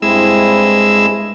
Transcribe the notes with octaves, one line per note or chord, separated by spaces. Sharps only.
G2 G#3 C4 E4 E6